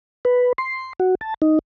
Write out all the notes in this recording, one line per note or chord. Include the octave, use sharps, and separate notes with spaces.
B4
C6
F#4
A5
D#4